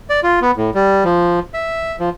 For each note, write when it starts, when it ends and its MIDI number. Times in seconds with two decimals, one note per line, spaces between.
0.09 0.20 74
0.23 0.39 65
0.41 0.51 59
0.57 0.70 45
0.74 1.04 55
1.04 1.40 53
1.54 1.96 76
2.00 2.10 53